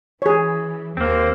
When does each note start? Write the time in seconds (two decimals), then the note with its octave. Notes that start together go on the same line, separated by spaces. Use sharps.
0.22 E3 G#4 C#5
0.97 D#2 A#3 C4 C5